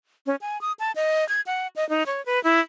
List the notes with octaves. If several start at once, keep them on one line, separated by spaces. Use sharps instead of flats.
C#4
G#5
D#6
A5
D#5
G#6
F#5
D#5
D#4
C#5
B4
E4